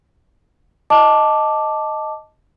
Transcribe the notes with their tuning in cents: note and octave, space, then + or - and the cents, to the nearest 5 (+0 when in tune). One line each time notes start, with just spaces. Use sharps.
D#5 +0 A5 +0 D6 +0